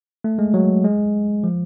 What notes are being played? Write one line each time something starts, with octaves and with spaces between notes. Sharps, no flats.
A3
G#3
F#3
G#3
F3